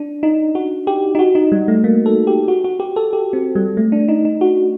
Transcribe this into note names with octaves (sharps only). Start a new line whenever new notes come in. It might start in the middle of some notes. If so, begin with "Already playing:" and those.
Already playing: D4
D#4
F#4
G4
D#4
F#4
D#4
G3
A3
A#3
A4
G4
F#4
F#4
G4
A4
G4
C4
G3
A3
D4
D#4
D#4
F#4